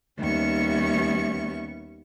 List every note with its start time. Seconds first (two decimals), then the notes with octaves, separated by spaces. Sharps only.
0.18 D#2 G3 B3 C#4 E5 C#6